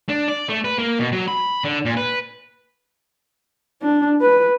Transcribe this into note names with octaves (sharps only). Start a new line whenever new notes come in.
D4
D5
A3
B4
A#3
B2
F#3
B5
D3
A#2
B4
D4
B4